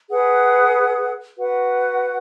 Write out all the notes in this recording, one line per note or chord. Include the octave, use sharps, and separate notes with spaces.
G#4 B4 F#5
F#4 B4 F#5